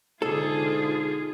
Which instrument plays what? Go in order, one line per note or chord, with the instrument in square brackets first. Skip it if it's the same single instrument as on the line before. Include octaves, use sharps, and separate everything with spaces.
[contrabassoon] G#2 [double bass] B2 D3 [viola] F4 G#4 [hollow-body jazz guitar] A4